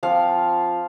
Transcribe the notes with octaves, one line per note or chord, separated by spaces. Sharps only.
F3 C4 F4 F5